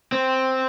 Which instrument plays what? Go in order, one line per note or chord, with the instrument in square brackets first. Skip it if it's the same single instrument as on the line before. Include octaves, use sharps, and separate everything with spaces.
[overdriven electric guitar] C4